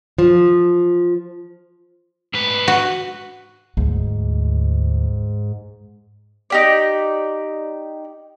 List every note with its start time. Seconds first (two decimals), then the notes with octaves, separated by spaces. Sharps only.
0.18 F3
2.33 G#2 B4
2.68 F#4
3.77 D2 G#2
6.50 D#4 G4 D5